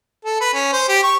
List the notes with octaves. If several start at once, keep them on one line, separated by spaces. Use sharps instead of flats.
A4
B4
C#4
C5
G4
C#6